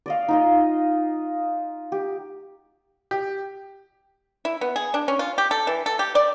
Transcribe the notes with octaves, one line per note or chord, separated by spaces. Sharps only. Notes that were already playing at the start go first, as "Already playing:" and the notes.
D5 D#5 F5
D#4 F4 D#5
G4
G4
E4
B3
G#4
D4
C#4
F4
G4
A4
E3
A4
G4
D5